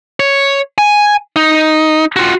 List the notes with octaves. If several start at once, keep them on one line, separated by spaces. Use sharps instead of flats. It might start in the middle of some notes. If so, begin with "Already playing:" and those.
C#5
G#5
D#4
F4 F#4